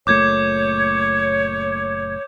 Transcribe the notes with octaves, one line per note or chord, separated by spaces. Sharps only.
F#1 A#2 A3 C#5 D6 G6 G#6